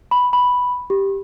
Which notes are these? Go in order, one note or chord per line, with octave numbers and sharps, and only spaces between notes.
B5
B5
G4